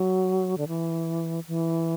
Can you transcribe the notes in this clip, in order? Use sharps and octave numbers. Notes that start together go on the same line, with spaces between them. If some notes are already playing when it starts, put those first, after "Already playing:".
Already playing: F#3
D3
E3
E3